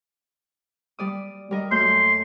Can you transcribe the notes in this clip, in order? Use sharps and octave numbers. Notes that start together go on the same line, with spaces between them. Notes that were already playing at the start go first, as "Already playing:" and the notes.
G3 D5 D#6
G3 A#4 D#5
F#2 A3 C6 G6